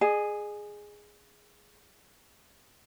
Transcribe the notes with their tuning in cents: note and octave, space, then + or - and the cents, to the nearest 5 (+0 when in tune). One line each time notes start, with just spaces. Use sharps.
G#4 +0 D#5 -40